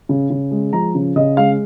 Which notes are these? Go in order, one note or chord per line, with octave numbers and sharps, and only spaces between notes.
C#3
C#3
G#3
F3 A#5
C#3
C#3 D#5
G#3 F5